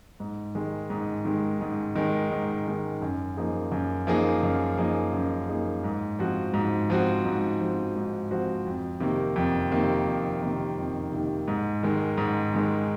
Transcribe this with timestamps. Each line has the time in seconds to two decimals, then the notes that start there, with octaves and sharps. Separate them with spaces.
0.20 G#2
0.55 D#3 G#3
0.90 G#2
1.25 D#3 G#3
1.61 G#2
1.96 D#3 G#3
2.31 G#2
2.67 D#3 G#3
3.02 F#2
3.37 F3 A#3 D#4 G#4
3.72 F#2
4.07 F3 A#3 D#4 G#4
4.43 F#2
4.78 F3 A#3 D#4 G#4
5.13 F#2
5.49 F3 A#3 D#4 G#4
5.84 G#2
6.19 F3 C4 F#4
6.54 G#2
6.90 F3 C4 F#4
7.25 G#2
7.61 F3 C4 F#4
7.96 G#2
8.31 F3 C4 F#4
8.66 F2
9.00 C3 D#3 A#3
9.36 F2
9.71 C3 D#3 A#3
10.07 F2
10.41 C3 D#3 A#3
10.78 F2
11.12 C3 D#3 A#3
11.48 G#2
11.83 D#3 G#3
12.17 G#2
12.54 D#3 G#3